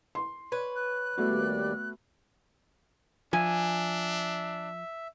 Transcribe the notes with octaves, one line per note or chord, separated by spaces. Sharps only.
C6
B4 C#5
F#6
D#2 G3 A3 B3 F#4 D5
F3 D4 E5 G#5